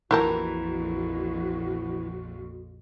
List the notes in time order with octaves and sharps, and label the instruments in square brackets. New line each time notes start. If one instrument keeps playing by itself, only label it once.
[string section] A#1 F2 [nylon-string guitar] E3 A#4 [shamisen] E4 G4 A5 [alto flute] F#4